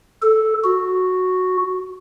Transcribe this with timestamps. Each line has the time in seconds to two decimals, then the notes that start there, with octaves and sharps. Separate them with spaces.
0.22 A4
0.64 F#4